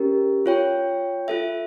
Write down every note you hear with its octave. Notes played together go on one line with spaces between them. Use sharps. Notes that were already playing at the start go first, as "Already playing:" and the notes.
Already playing: C#4 G4 A#4
F4 C#5 G5
F4 A4 E5